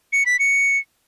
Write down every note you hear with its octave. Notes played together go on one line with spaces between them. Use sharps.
C#7
B6
C#7